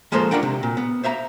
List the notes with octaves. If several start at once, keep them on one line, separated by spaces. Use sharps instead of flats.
F3 G#3 A#3 A4 C5
D4 F4 A#4 F#5 G5
C3
A#2
B3
C5 E5 F5 A#5